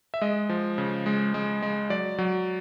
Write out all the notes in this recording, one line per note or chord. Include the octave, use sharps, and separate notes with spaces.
E5
G#3 D#5
F3
C#3
G#3
G#3
G#3
F#3 D5
F#3